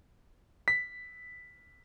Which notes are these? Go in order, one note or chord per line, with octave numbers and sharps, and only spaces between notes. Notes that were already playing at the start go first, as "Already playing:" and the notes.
B6